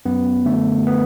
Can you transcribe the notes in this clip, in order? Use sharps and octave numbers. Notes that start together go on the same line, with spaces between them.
F#2 B3
D3 A3
B3